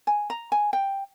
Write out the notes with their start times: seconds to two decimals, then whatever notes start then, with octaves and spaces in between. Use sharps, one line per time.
0.07 G#5
0.30 A#5
0.52 G#5
0.73 G5